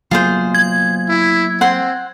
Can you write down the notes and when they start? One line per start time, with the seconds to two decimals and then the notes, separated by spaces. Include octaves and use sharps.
0.11 F#3 A#3 B3 F4 G#4 C5
0.55 G#6
1.09 E4
1.61 C4 F#5 C6